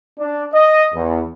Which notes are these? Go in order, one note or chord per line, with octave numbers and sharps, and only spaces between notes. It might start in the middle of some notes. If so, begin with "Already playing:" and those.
D4
D#5
E2